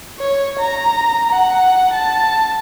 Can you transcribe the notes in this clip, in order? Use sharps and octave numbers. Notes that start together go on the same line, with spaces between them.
C#5
A#5
F#5
A5